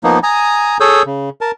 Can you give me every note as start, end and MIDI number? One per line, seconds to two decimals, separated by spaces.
0.04 0.19 53
0.04 0.19 58
0.04 0.19 59
0.04 0.19 63
0.23 0.77 80
0.23 0.77 82
0.23 0.77 87
0.80 1.02 68
0.80 1.02 69
0.80 1.02 73
0.80 1.02 87
0.80 1.02 88
0.80 1.02 91
1.06 1.30 49
1.41 1.51 70
1.41 1.51 81